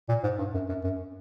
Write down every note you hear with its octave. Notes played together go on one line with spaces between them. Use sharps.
A#2
G#2
G2
F#2
F#2
F#2